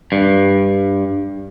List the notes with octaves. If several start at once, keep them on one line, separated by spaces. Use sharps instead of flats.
G2